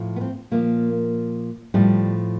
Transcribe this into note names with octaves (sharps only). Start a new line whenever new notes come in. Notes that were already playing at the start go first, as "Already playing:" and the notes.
Already playing: A2 F3
B3
C4
A#2 F3 A#3
A2 F3 G3